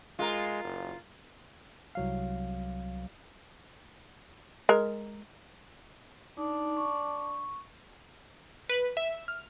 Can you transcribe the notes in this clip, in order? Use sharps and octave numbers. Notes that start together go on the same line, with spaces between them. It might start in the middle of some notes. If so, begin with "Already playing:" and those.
G#3 F4 A#4
F#1
C2 F#3 F5
G#3 A#4
D4 D#4
C#6
B4
E5
F6